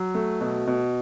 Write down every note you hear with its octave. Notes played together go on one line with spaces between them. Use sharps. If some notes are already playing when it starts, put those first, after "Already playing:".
Already playing: F#3
A3
B2
B2